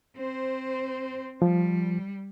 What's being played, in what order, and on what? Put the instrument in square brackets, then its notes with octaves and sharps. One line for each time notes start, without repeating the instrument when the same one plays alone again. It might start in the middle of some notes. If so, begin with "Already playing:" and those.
[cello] C4 C5
[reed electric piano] F3 [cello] G3